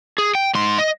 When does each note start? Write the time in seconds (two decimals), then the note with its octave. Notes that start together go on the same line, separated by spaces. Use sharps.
0.18 G#4
0.35 G5
0.55 G#2 C6
0.79 D#5